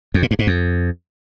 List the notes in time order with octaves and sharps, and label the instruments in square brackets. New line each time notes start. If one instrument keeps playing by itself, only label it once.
[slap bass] F2
A#2
G2
G#2
F2